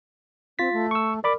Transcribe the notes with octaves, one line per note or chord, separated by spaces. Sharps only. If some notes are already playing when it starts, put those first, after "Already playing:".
C4 F4 A6 B6
A3
C#6 E6
A#4 D5 B5 D6